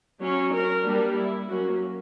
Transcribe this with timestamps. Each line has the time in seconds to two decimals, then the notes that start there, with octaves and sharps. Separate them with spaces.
0.22 F#3 C#4
0.53 A#4
0.85 G3 A#3 D4
1.16 E4
1.49 F#3 A#3 C#4 F#4